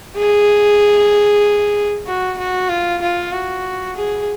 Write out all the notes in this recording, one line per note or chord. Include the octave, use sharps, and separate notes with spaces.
G#4
F#4
F#4
F4
F4
F#4
G#4